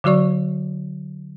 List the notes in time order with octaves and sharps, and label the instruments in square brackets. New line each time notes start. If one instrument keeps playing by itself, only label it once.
[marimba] D3 F#3 F#4 D5 C#6